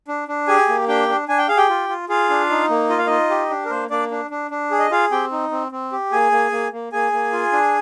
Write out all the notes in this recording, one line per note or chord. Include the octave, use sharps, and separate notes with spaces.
D4
D4
G4 G#4 G#5
A#3
D4 G4 G5
D4
D4 G#5
G5
G#4 F5
G4 G5
F4
F4
F4 G#4 F5
D4
D#4
A#3
F4 D#5
F5
D#4 F4 D#5
G4
D4
A#4
A#3 C5
A#3 D4 D5
D4
D4
D4
G#4
D#5
F4 G#4 F5
C4 G4 G5
D#4
C4
C4
G4
A#3 G#4 G#5
A#3
A#3
A#3
A#3 G#4 G#5
A#3
F4
D4